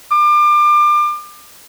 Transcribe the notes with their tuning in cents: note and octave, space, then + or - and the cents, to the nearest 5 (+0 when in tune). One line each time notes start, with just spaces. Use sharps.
D6 +30